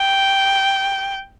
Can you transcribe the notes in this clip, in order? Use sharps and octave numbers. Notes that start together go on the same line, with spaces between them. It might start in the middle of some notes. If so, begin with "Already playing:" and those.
Already playing: G5